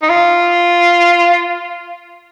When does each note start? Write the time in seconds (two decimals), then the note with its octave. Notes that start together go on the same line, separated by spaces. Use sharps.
0.02 D#4
0.09 F4